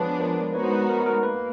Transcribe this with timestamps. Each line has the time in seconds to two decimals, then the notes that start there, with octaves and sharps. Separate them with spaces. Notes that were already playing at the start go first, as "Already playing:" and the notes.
Already playing: F3 G#3 B3 D4 B4 C#5
0.20 A#4 C5
0.54 G#3 B3 D#4 F#4 B4 C#5
0.63 C5
0.71 B4
0.89 A#4
1.06 A#4
1.23 A#3 B4